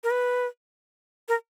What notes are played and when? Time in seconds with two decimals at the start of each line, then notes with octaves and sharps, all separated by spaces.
0.04 A#4
0.11 B4
1.28 A#4